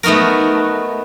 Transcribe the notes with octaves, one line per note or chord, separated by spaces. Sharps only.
A3 B3 D#4 F#4 A#4